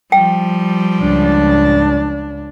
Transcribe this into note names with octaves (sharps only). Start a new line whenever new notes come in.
F3 G3 G5
C#2 D4